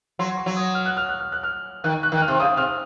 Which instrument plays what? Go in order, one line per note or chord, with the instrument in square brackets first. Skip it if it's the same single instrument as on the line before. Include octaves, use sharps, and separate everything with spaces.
[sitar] F#3 [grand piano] C6
[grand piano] C#6
[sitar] F#3
[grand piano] D#6
F6
F#6
F6
F#6
F6
F#6
F6
[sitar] D#3 [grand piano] F#6
[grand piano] F#6
[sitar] D#3
[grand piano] F#6
F6
[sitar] C3
[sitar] C#3 [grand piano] D#6
[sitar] C3 [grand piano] F6